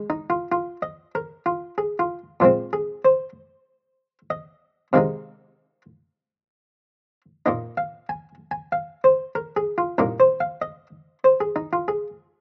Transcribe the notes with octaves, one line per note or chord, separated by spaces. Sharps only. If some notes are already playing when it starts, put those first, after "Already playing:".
Already playing: G#3
D#4
F4
F4
D#5
A#4
F4
G#4
F4
A#2 F3 G#3 C4 F4
G#4
C5
D#5
C3 D#3 G#3 D#4 F5
A#2 A#3 D#4 D#5
F5
G#5
G#5
F5
C5
A#4
G#4
F4
C2 A#2 A#3 D#4 A#4
C5
F5
D#5
C5
G#4
D#4
F4
G#4